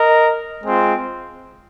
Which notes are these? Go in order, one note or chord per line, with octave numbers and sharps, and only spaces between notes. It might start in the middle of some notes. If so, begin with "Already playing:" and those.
Already playing: A#4 D#5
G#3 C4 F4